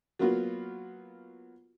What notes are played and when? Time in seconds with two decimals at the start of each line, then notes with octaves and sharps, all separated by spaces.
0.19 F#3 A#3 B3 F4 F#4